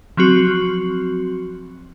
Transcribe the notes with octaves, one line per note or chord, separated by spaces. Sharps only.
F3 F#3 C4 F#4